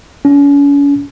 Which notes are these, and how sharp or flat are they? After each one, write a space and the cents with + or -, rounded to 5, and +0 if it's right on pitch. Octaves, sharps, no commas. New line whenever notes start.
C#4 +40